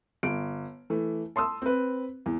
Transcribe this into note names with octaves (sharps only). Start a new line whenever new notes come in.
G1 D7
E3 A3
A5 C6 D#6 E6
C4 B4
E2